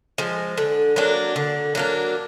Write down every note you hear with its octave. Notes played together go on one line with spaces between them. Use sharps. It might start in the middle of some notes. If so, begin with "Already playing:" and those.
F3 G#3
D3
F#3 A#3 D4
D3
F#3 A#3 D4